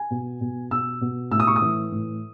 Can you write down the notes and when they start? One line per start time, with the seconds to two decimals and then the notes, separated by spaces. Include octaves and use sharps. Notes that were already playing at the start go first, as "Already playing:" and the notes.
Already playing: G#5
0.11 B2
0.41 B2
0.71 B2 E6
1.01 B2
1.31 A2 E6
1.40 D#6
1.47 C#6
1.56 D#6
1.62 E3
1.92 A2